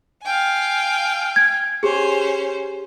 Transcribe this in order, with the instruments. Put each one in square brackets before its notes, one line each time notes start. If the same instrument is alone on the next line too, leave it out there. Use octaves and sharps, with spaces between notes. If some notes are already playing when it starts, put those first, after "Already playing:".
[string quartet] F5 G5 G#5
[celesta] G#6
[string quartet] C#4 C5 [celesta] G4 G#4